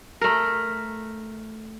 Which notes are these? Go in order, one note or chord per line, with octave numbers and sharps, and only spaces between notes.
A3 A#4